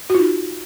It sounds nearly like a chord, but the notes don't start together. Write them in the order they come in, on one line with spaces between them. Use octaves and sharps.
F#4 F4 D#4